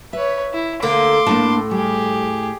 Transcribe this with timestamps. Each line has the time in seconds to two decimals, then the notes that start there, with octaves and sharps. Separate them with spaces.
0.13 B4 C#5 E5
0.53 E4
0.82 D2 D3 A#3 C6 D6
1.27 A2 A#3 D4 A5
1.71 G3 G4 G#4